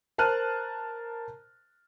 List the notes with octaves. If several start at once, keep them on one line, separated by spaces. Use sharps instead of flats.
A#4 C5 A5 F6 F#6 D#7